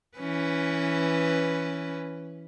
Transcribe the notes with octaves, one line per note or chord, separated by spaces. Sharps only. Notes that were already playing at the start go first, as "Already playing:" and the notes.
E3 C#4 B4